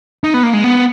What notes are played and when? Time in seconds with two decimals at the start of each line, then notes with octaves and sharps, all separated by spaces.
0.24 D#4
0.34 B3
0.43 A#3
0.53 G#3
0.64 B3